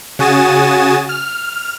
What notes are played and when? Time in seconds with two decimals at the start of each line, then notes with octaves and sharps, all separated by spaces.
0.19 C#3 F#4 G#5 D#6 A6 E7
1.09 F6